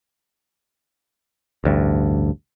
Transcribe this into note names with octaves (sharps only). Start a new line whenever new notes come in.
A1 D2 G2